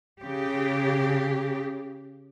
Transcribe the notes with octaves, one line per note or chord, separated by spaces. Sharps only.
C#3 G4